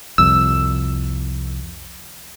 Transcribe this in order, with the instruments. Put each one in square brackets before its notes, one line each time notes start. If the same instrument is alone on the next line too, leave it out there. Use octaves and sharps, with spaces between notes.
[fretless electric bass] C2 F2 [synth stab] E6